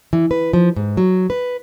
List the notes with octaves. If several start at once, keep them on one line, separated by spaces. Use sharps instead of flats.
E3
B4
F3
G#2
F#3
B4